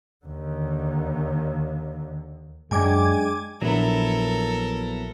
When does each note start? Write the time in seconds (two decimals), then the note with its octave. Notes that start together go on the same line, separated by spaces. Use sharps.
0.25 D#2 D3
2.71 F#2 G#3 D4 D5 G5 G#5 D6 G#6
3.62 A#1 F#3 B3 E4 A4 A#4